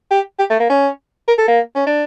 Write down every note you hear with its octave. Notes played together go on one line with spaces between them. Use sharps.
G4
G4
A3
A#3
C#4
A#4
A4
A#3
C#4
D4